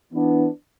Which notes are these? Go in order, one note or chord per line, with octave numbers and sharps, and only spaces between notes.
E3 B3 D4